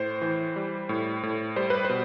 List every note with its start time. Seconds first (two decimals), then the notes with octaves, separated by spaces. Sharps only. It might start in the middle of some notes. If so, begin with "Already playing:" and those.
Already playing: A2 C5
0.22 E3
0.56 G3
0.89 A2
1.23 A2
1.56 G3 C5
1.70 B4
1.85 B2 C5